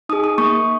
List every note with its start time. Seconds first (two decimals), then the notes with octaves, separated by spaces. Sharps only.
0.09 D#4 G#4 D#6
0.24 D#6
0.38 A#3 C#6